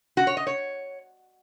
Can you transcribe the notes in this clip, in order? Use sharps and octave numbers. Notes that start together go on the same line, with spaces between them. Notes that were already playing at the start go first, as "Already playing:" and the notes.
F#4
C#5
D#5
C#5